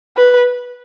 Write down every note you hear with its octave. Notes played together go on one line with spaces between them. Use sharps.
B4